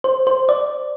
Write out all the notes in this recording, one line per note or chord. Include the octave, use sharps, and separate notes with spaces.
C5
C5
D5